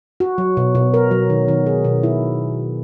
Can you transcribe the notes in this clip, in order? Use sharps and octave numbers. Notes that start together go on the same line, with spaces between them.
F#4
F#3
B2
B2
A#4
F#3
D#3
D#3
G#4
B2
E4